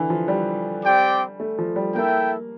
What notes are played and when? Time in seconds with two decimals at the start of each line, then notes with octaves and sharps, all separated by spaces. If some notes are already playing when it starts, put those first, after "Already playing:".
Already playing: D3 E3
0.10 F3
0.28 G3
0.84 C4 G4 D5 G5
1.40 A3
1.59 F3
1.76 G3
1.94 A#3 E4 A4 E5 G5